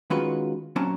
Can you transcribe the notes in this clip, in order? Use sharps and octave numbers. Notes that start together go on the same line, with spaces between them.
D#3 G#3 C#4 F4 F#4 B4
A#2 F#3 C4 C#4 A5 A#5